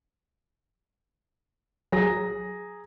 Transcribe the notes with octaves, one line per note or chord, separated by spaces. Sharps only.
F#3 G#4 A#5 A#6